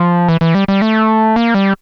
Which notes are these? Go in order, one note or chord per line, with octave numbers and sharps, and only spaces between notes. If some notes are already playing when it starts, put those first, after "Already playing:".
Already playing: F3
E3
E3
G3
G3
A3
A#3
G3